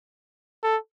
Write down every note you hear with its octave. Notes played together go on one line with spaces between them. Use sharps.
A4